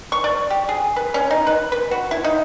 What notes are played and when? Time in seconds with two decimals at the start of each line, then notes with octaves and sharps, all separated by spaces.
0.12 C#6
0.24 D5
0.50 G4
0.69 G#4
0.96 B4
1.14 C#4
1.31 D#4
1.47 B4
1.72 B4
1.91 F#4
2.11 E4
2.24 D#4